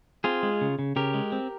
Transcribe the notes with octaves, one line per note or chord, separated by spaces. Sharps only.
C4 F4 G#4
G#3
C#3
C#3
C#3 G4 A#4
G#3
C4